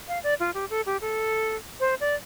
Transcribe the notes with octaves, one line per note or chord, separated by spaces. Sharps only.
F5
D5
F4
G4
A4
G4
A4
C5
D5